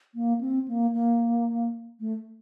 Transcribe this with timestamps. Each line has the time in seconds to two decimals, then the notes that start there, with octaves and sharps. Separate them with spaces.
0.15 A#3
0.41 C4
0.68 A#3
0.93 A#3
2.00 A3